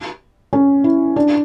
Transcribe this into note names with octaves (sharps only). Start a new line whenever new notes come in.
C#4
E4
D4